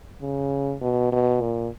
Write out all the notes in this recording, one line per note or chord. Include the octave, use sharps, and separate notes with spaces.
C#3
B2
B2
A#2